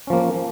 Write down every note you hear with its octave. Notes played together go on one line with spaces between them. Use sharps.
F3 A#3 C#4